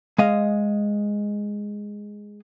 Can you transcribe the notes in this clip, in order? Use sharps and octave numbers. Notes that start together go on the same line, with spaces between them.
G#3 D#5 F5